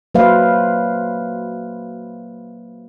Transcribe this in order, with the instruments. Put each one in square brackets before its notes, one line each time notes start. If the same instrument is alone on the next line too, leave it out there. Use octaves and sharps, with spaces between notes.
[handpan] F#3 A#3 B4 C5 E5 F5